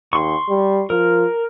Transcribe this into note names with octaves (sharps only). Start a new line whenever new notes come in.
D#2 C6 C#6
G3
F3 A#4